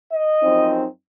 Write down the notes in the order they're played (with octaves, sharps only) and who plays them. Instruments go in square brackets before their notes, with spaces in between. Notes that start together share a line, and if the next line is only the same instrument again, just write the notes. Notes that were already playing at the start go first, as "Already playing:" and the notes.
[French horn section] D#5
F#2 F3 C4 D#4